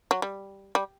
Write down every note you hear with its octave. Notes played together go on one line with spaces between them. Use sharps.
F#3
G3
G3